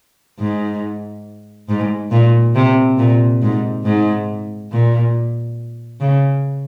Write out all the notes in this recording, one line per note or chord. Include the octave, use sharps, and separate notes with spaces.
G#2
G#2
A#2
C3
A#2
G#2
G#2
A#2
C#3